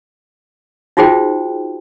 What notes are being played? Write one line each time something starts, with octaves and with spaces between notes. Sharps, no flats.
D#4 F4 F#4 G#4 C5 G5